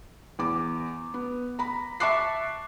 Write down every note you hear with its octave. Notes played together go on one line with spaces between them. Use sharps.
E2 D6
B3
A#5 B5
E5 A5 C#6 D6 F#6 C7